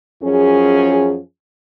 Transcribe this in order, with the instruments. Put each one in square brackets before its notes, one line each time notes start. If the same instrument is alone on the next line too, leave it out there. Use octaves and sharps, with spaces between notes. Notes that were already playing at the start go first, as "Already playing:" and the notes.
[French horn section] F#2 F3 C#4 G#4